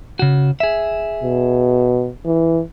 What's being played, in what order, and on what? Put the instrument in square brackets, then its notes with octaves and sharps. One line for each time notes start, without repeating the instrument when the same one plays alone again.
[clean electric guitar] C#3 F#4
G#4 E5
[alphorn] B2
E3